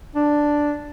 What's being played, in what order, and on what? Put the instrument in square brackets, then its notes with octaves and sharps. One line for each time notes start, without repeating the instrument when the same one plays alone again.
[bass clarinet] D4